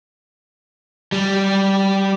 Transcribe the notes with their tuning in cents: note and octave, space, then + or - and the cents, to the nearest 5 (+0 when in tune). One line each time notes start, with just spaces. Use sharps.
G3 -10